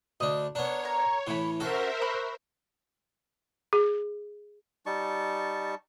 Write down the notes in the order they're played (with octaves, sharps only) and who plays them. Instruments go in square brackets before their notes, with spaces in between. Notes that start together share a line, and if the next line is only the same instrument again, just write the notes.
[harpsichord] D2 D4 [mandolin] D#5
[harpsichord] B3 D4 [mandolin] A#4 [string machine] C#5
[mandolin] A#4 A#5
[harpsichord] A2 E3 [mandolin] B5 C6
[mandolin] C#4 D4 F#4 [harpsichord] A4 [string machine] A#4 C5 E5
[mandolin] B5 C#6 F#6
[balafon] G#4
[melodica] G3 D#4 A5 C#6